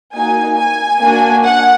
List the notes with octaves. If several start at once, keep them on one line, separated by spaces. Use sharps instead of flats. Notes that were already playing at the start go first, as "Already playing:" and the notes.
A#3 D#4 F#4 G#5
G#5
A#3 D4 F#4
F#5